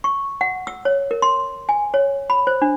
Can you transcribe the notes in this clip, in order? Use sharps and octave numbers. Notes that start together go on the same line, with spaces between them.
C#6
F#5
E6
C#5
A#4
C6
G#5
C#5
B5
C5
D4